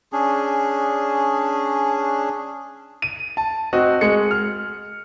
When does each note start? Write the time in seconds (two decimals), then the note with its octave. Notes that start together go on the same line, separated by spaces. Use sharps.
0.13 C#4 D4 G#4
3.02 D#7
3.37 A5
3.73 C4 F#4 D#5
4.01 G#3 C#7
4.31 F6